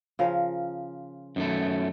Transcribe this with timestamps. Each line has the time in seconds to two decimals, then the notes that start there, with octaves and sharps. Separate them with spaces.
0.19 C#3 F3 A#4
1.36 F#2 D#3 A3